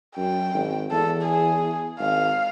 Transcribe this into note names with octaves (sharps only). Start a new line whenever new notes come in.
F#2 G5
G#1
E2 A4
G#4
G#1 F5